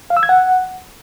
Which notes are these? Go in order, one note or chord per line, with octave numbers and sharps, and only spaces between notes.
F5
E6
G#6
F#5